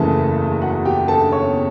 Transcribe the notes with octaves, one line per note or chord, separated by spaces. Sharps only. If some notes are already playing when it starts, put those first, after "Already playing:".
Already playing: F#1 E2 C#3 E3 A3 A4 A5
F#4 F#5
G4 G5
A4 A5
C#5 C#6